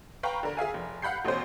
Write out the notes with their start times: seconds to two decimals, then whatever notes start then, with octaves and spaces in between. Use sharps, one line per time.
0.23 B4 F5 G5 A#5 B5 C#6
0.43 D3 A#4
0.57 G#4 E5 F5 G#5
0.74 F1
1.02 F5 F#5 B5 G6 C7
1.25 A1 D2 B2 C#4 C5